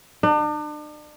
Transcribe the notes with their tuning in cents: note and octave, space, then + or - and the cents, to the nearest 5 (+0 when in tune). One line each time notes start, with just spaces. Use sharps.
D4 +40